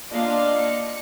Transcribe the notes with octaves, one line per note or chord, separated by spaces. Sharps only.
A#3 D4 F4 D5 D#5 F5
C#7